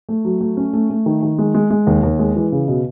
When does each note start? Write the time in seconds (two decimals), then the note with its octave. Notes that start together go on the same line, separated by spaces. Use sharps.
0.09 A3
0.25 F#3
0.41 A3
0.57 C#4
0.73 A3
0.90 A3
1.06 D#3
1.23 D#3
1.39 G#3
1.55 G#3
1.70 G#3
1.87 D#2
2.03 D#2
2.19 G#3
2.36 E3
2.52 C#3
2.68 B2